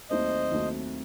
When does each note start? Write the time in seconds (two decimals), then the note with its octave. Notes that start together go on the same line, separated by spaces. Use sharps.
0.10 D#2 D#3 F#3 A3 C4 C5 D#5
0.52 D#2 D#3 F#3 A3 C4